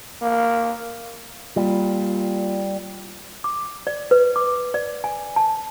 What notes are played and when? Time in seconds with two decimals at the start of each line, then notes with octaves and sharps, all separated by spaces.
0.22 A#3
1.56 A#2 G3
3.44 D6
3.87 D5
4.11 B4
4.36 D6
4.74 D5
5.04 G#5
5.36 A5